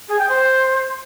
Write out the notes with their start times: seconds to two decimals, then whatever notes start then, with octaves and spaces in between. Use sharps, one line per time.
0.08 G#4
0.19 G5
0.29 C5